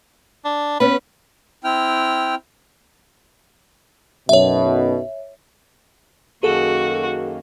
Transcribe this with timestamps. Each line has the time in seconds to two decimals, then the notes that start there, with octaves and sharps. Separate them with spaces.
0.45 D4
0.80 B3 C#4 B4
1.64 C4 E4 G5 F6
4.29 B1 F#2 B2 C#5 E5
6.43 F#2 D#3 A#3 F#4 G#4 A4